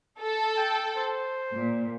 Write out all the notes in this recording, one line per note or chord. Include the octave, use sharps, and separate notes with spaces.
A4
G5
C5
A#2